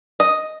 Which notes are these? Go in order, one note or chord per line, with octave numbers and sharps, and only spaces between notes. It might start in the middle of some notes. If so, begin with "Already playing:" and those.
D#5